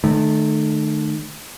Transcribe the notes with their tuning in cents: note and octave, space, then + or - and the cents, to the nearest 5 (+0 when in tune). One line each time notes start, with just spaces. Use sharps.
D#3 -40 A3 -15